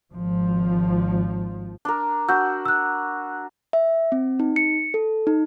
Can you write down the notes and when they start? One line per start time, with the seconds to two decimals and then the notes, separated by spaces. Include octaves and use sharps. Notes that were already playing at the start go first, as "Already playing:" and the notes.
0.14 G#1 F3
1.85 D4 A#4
2.28 D4 F#4 E6 G6
2.66 E6 F#6
3.73 E5
4.12 C4
4.40 D#4
4.56 C#7
4.94 A4
5.27 D#4